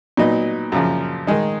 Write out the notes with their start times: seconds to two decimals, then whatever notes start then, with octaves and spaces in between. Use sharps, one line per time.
0.17 A#2 F#3 B3 D#4
0.72 F#2 C#3 F3
1.27 D#3 G#3 D#4